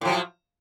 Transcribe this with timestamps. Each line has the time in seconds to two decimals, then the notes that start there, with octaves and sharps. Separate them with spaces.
0.01 A2
0.05 F3
0.09 F#3